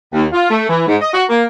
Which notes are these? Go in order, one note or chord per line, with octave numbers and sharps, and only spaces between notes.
D#2
F4
A3
E3
G#2
D#5
F#4
A#3